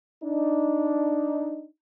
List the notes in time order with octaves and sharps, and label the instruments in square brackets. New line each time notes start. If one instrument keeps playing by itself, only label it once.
[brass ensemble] D4 D#4